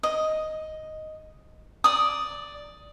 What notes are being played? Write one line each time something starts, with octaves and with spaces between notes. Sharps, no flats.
D#5
D5 D#6